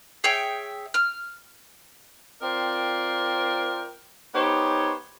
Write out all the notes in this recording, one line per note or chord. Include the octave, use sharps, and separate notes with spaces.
G#4 C#5 E5 G5
F6
C4 F4 A#4 C5 D5 G5
B3 D#4 G4 C5 C#5